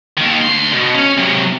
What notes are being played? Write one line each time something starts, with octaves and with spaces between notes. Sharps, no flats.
D#2 D#3
D2 C6
B2
C#4
C3 F#3